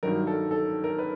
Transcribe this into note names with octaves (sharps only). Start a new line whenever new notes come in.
G2 D#3 F#3 A#4
A4
A4
A#4
B4